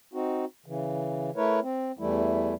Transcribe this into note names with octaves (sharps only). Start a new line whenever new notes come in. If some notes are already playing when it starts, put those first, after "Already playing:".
C4 D#4 F#4
C#3 E3
A3 E4 A#4 B4 C#5
C4
E2 E3 G3 A3 E4